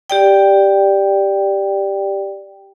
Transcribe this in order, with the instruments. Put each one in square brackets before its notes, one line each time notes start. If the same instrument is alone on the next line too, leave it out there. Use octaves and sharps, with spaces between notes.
[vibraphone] G4 D5 G5